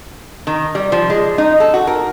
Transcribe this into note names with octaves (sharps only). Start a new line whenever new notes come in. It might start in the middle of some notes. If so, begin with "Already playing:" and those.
D#3
G3
F3
G#3
D#4
A4
F#4
A#4